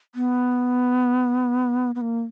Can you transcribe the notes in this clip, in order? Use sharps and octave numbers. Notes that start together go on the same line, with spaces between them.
B3
B3
A#3